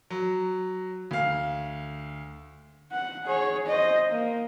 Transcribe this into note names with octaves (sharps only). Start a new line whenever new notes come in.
F#3
D2 F5
F#5
G#4 C#5
C5 D#5
A#3